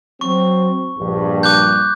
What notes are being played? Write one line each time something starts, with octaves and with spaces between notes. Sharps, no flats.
F#3 C4 C#6
A#1 G2
D6 F#6 G6